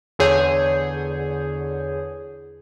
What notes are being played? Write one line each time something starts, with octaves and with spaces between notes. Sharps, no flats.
E2 D3 G#4 C#5 G6